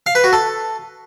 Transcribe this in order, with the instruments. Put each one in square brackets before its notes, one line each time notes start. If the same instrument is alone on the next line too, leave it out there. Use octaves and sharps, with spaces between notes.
[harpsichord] F5
B4
F#4
A4